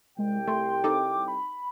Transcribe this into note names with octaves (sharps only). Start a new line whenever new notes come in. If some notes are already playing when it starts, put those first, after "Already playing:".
C2 G#3 G4 G5
A3 C6
C4 D#4 A4 D6
B5